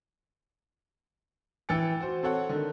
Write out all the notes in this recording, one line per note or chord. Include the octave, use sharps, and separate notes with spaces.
E3 G5 E6 A6 C#7
F#4 C5
C4 A4 C#5 F#5
D3 D#3